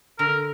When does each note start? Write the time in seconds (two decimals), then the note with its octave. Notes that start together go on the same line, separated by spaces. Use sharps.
0.19 D3 A#4